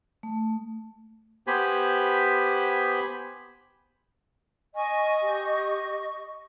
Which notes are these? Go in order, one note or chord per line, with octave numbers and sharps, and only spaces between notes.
A3
B3 G4 C5 G#5 B5
D#5 G#5 C#6
G4